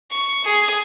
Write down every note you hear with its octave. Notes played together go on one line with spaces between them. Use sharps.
C#6
G#4